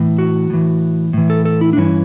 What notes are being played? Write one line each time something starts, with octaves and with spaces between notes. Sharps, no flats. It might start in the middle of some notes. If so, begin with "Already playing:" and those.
Already playing: A2 E3
F#4
A2 E3
A2 E3
A4
A4
E4
D4
G2 E3 C#4